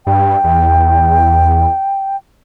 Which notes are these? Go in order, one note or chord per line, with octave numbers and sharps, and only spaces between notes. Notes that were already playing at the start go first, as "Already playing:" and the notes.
G2 G5
E2